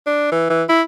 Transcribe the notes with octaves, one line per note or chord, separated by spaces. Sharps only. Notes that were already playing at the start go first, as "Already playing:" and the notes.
D4
E3
E3
E4